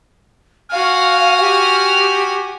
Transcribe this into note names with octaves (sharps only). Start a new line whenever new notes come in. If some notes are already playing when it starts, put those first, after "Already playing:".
F#4 F5 G#5 F6
G4